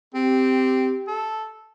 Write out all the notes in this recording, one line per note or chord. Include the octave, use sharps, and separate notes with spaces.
C4 G4
A4